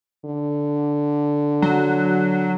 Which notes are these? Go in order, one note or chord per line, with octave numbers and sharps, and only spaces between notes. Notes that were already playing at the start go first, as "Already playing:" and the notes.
D3
F#3